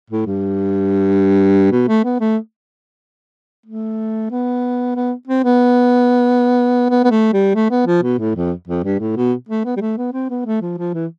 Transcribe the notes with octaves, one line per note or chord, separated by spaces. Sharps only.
A2
G2
B2
A3
B3
A3
A3
B3
B3
C4
B3
B3
B3
A3
G3
A3
B3
F3
B2
A2
F2
F2
G2
A2
B2
A3
B3
G3
A3
B3
C4
B3
A3
F3
F3
E3